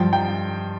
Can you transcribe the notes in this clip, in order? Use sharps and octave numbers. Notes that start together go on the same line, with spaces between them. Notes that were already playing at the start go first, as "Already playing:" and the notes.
Already playing: G2 F3 G5
G5